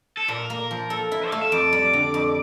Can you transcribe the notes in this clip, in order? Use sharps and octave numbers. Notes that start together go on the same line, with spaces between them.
A4
A#2 A#4
A#3
F3
A4
E4
A3 F5
E5
F2 D5
G3
D3
F2